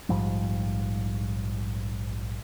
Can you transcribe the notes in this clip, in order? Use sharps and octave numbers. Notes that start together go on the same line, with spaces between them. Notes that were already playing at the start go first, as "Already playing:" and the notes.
A#1 G#2 F3 G3